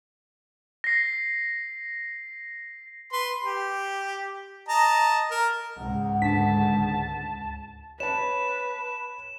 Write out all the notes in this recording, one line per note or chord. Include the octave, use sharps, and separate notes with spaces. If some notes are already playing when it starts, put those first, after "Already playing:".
A#6 C7
B4 C6
G4
D#5 A5 A#5
A#4
C#2 G#2 F#5
D2 A5 B6
B4 C#5 A5 E7